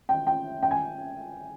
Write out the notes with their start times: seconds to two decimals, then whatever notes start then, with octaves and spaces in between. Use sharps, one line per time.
0.09 G5
0.27 G5
0.63 G5
0.71 G#5